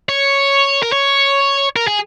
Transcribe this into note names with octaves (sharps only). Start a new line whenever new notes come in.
C#5
A#4
C#5
A#4
G#4